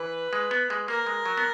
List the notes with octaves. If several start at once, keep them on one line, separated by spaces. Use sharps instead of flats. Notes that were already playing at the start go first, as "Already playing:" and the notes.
Already playing: E3 B4
G#3
B3
G#3
A#3 A#4
G#3
F#3
B3